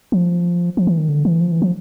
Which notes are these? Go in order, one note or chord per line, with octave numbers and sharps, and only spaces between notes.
F3
F3
E3
D#3
D3
E3
F3
E3
F3